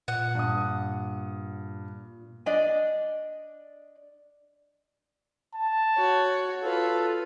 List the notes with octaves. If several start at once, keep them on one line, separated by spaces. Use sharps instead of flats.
A#2 F#5
G2 D#6
D4 D5 D#5 G#5
A5
F#4 C#5
F4 A4 B4